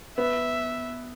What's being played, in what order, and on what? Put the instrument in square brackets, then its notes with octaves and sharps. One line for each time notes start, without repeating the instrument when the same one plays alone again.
[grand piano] B3 [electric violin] E5